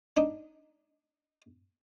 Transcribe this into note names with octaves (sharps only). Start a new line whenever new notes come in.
D4 D#4